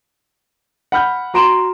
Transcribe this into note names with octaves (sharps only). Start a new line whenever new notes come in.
F#5 B5 F6 G6
F#4 A#5 C6 D7 E7